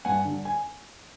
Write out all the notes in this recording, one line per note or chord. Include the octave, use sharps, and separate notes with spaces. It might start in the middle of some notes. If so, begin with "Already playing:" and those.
G2 F#5 G#5
D3 G3
G#5